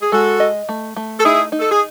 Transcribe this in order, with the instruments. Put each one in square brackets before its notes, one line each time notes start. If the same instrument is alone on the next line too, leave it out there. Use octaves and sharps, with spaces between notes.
[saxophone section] G#4
[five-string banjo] G#3 [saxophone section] F#4 A4
[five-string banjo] D#5
A3
A3
[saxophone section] A4
[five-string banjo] D#4 [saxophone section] E4 G#4
[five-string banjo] D#4
[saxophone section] A4
G#4